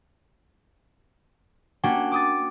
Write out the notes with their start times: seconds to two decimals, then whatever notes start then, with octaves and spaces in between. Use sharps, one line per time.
1.83 A#3 C#4 D4 F#4 F#5 G5
2.12 D6 D#6 A6